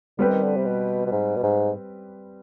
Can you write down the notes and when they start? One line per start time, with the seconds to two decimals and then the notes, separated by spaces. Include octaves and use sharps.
0.18 D3 G3 C4 G4 B4
0.31 D#3
0.43 D3
0.57 C3
0.65 B2
1.06 B2
1.12 G#2
1.37 B2
1.43 G#2